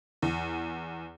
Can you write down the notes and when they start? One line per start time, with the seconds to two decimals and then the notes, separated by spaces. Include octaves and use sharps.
0.22 E2